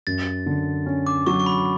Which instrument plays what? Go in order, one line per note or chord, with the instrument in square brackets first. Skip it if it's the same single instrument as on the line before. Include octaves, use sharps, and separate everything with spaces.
[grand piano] F#2 [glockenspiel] A6
[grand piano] D3
C#4
[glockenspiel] D6
[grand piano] F#3 [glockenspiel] C#6
[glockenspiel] C#6
B5